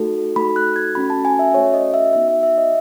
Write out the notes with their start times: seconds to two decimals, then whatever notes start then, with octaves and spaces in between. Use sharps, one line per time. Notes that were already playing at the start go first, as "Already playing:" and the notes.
Already playing: A3 D#4 F#4 A4
0.36 A3 D#4 F#4 A4 B5
0.56 F#6
0.76 G#6
0.95 A3 C#4 F#4 A4 B5
1.10 A5
1.25 G#5
1.39 E5
1.54 A3 C#4 F#4 A4 C#5
1.74 D#5
1.94 E5
2.13 B3 D#4 F#4 E5
2.28 E5
2.43 E5
2.58 D#5